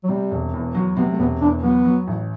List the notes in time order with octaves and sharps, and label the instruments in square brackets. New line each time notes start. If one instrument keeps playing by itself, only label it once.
[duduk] F#3
[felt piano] C3 [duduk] G3
[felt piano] E1
E2
F#3
[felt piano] C3 [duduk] B3
[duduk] A3
[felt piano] E1 [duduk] B3
[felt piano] E2 [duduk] D4
[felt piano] F#3 [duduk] B3
[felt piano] F#3
A1